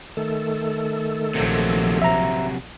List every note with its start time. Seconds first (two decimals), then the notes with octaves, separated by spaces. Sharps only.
0.17 D#3 A3 A4
1.35 A#1 C3 F3 F#3
2.02 E5 A#5